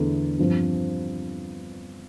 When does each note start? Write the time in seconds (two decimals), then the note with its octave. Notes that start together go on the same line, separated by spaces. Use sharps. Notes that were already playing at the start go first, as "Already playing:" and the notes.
Already playing: E2 D3 A3
0.39 G2 F3 C4